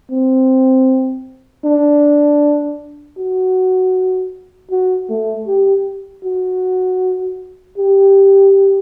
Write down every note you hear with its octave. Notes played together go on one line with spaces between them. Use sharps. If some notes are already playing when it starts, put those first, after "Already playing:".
C4
D4
F#4
F#4
A3
G4
F#4
G4